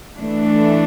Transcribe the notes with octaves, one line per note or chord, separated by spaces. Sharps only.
E3 A3 D4